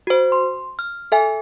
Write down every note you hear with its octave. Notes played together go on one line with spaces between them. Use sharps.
F#4 C5
C6
F6
A4 E5 G#5